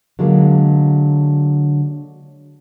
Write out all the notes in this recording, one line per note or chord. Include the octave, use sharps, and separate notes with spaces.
D3 F#3 G#3 A#3